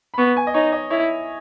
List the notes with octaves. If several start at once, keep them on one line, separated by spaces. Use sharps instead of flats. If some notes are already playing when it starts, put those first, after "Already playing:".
B5
B3 C#6
G#5
D#5
D#4 C#5
D#5
E4 C#5